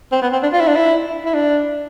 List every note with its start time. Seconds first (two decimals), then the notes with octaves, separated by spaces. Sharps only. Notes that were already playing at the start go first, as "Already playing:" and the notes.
0.12 C4
0.22 B3
0.32 C4
0.43 D4
0.53 F4
0.60 E4
0.67 D4
0.75 E4
1.25 E4
1.34 D4